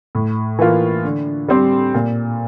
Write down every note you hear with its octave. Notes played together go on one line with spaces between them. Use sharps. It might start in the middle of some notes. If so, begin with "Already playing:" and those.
A2
E3 A#3 F4
D3
G3 C4 G4 C5
A#2